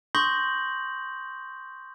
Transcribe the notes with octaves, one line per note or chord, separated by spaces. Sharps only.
C6 C#6 D#6 G6 A#6 F#7